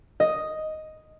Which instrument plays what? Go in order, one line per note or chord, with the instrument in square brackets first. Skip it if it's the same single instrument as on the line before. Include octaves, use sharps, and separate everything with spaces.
[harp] D#5